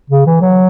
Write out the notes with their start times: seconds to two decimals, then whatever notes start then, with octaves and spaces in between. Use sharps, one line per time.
0.10 C#3
0.26 E3
0.41 F#3